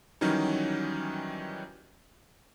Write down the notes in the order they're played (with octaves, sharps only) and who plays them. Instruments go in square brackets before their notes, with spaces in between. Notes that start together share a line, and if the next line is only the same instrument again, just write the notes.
[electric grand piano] D#3 E3 F#3 G3 C#4 D#4